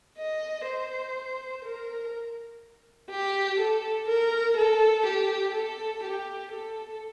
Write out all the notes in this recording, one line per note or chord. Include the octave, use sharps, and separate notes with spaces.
D#5
C5
A#4
G4
A4
A#4
A4
G4
A4
G4
A4